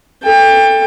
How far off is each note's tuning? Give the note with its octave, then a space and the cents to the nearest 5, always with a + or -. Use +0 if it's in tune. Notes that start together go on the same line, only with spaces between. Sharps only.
A4 +10 G5 +30